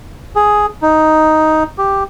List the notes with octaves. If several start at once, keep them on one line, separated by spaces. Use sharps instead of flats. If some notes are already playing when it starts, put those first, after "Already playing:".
G#4
D#4
G4